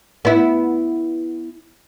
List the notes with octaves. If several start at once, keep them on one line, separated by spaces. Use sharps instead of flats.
B3 E4